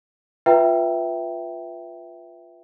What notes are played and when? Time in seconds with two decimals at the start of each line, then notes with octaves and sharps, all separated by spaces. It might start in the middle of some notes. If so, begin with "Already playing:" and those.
0.46 F4 B4 E5 G5 A#5